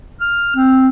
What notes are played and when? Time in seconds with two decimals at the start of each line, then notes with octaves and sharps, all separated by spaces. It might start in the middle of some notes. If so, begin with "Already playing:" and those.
0.21 F6
0.56 C4